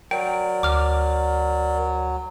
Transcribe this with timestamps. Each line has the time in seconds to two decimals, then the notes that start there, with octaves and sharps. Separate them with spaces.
0.11 F#3 A#4 D5 G5
0.63 D2 D6 F6